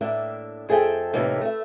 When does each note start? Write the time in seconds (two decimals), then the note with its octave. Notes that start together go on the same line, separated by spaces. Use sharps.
0.01 A2 A#3 D4 E5
0.69 F2 G#4 A4 E5 G5
1.13 A2 C3 E3 A3 A#3 D#4
1.41 A3 E5